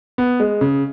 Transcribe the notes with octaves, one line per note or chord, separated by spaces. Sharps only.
B3
G#3
C#3